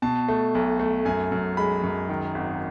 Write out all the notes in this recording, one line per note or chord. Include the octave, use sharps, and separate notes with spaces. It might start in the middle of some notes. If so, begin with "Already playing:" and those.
B2 A5
A3
B1
A3
F#2 G#5
F#2
G#3 B5
F#2
D#3
G#1